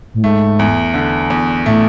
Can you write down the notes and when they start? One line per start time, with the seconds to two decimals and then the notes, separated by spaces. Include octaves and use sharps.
0.14 A2
0.23 G#2 A3
0.59 E2
0.94 D3
1.30 E2
1.66 A2 A3